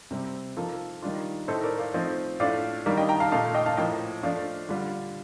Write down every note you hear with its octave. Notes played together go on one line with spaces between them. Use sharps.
C3 G3 C4
F3 A#3 D#4 F4 A4
D#3 G3 D4 F4
A2 A3 D#4 A4 C5
A#4 D5
D5 F5
F3 A3 C4 D#4
A2 A3 D4 F4 D5 F5
D#3 G3 A#3 D4
D#5 G5
G5 A#5
F5 A5
A#2 A3 D#4 F5 A5
D#5 G5
F5 A5
A2 F3 A#3 D#5 G5
F3 A3 D4 D5 F5
D3 G3 D4 F4